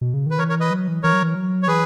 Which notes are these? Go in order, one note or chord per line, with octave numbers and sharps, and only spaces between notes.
B2
C#3
D#3 B4
E3 A#4 C#5
A#4 C#5
B4 D#5
F#3
E3
E3 A#4 C#5
F#3
E3
F#3
C#5
E3 G#4 B4